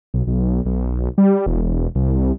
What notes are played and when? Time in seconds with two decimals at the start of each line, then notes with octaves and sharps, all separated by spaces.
0.14 B1
0.27 B1
0.66 B1
1.18 G3
1.46 E1
1.62 E1
1.95 C2